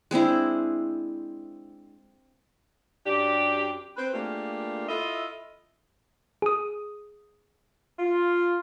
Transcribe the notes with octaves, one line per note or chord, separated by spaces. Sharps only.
G#3 C4 D4 E4
F#2 D4 G4
C4 B4
A3 A#3 D4 F4 G4 G#4
E4 F4 A4 D#5 E5
G#4 D#6
F4